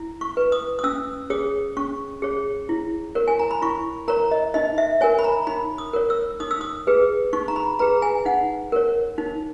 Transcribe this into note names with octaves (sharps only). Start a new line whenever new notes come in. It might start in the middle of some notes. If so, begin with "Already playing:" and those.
Already playing: E4
C#6
B4
D#6
D#6
C#4 E6
G#4 C#5 D#6
C#4 C#6
G#4 C#5
E4
A#4 C#5
G#5
A#5
B5
E4 C#6
A#4 C#5 A#5
D#5
D#4 D#5
E5
A#4 C#5 G#5
B5
A#5
D#4 B5
D#6
A#4 C#5
E6
D#4 D#6
E6
D#6
G#4 B4
D#4 C#6
A#5
B5
G#4 B4 A#5
G#5
D#4 F#5
A#4 C#5
D#4